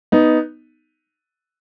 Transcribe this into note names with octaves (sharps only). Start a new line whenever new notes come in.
B3 D#4